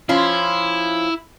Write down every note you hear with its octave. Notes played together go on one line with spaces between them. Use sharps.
F3 C#4 E4 F4